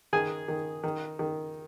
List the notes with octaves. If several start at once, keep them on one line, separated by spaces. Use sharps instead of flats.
D#3 G#4 G#5
D#3
D#3
D#3